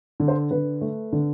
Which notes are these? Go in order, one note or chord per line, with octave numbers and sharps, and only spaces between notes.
D3
C5
D3 B4
A3
D3